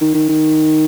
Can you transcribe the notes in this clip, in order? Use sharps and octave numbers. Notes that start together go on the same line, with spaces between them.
D#3
D#3
D#3